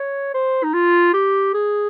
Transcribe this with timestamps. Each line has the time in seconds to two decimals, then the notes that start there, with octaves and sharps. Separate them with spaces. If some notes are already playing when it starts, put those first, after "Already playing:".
Already playing: C#5
0.34 C5
0.64 D#4
0.74 F4
1.13 G4
1.54 G#4